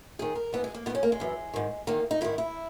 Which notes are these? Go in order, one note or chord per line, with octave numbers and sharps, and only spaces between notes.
D#2 D#3 G#4
A#4
G#2 E3 B3
G#3
A#3
G#2 D#3 B3 C#4
A#3
G#3
F#2 E3
G#2 D#3
E2 D#3 A#3
D#4
G#2 D#3 E4
E4